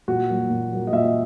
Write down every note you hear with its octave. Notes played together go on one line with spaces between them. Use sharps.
A#2 F#4
F#3 A#3
A#2
F#3 A#3
D#5
A#2 E5
D#5